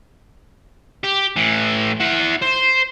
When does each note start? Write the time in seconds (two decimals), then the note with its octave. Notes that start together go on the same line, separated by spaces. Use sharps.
1.03 G4
1.36 A2 E3
2.00 E4 F#5
2.42 C5